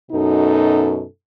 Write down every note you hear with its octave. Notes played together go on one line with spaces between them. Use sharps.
F#2 B2 D#4 A4